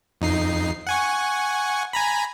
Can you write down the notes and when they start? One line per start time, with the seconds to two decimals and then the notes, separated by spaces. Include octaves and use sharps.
0.21 F2 D#4 C7
0.87 F#5 G#5 C#6
1.93 G#5 A#5 B5